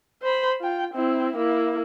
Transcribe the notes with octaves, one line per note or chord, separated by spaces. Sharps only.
C5 B5
F4 G5
C4 E4
A#3 E4